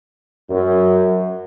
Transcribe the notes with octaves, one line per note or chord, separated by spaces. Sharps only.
F#2